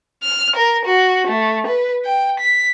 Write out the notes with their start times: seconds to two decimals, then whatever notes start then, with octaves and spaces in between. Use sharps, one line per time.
0.23 F6
0.56 A#4
0.86 F#4
1.28 A3
1.67 B4
2.05 G5
2.40 B6